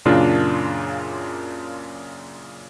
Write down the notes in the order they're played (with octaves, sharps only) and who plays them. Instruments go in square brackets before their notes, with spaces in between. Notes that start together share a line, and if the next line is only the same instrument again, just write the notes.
[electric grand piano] F#2 A#2 C#3 D4 F4 A#4